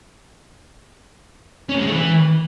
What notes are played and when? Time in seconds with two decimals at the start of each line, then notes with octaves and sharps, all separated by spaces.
1.69 C#4
1.75 A2
1.80 G#3
1.86 A3
1.92 E3